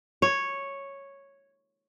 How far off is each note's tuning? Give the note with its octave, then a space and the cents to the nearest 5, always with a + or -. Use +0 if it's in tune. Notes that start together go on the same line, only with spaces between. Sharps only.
C#5 -5